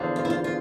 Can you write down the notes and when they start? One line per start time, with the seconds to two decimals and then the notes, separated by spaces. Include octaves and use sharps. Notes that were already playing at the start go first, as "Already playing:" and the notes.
Already playing: E2 D3 F3
0.16 F4
0.25 E4
0.30 F4
0.44 F4